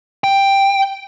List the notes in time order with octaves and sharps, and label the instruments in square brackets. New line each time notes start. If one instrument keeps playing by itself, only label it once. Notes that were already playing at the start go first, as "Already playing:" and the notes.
[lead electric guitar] G5